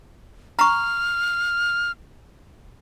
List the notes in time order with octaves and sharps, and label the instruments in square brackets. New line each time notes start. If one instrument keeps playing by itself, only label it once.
[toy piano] A#5 C#6 [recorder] F6